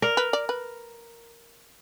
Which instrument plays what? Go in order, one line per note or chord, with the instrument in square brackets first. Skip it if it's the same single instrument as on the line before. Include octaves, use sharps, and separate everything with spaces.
[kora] A#4 [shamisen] D5
[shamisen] B4
D5
B4